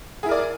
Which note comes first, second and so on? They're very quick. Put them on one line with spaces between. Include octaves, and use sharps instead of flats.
G#4 E4 A#4 D5